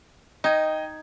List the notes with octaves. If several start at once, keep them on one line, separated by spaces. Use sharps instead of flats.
D#4 D#5 G5 G#6